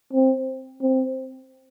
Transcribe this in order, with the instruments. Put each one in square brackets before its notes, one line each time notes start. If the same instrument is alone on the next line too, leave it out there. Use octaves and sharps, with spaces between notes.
[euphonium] C4
C4